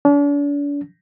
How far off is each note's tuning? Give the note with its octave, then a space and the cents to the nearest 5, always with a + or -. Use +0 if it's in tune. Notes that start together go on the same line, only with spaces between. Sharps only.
D4 -40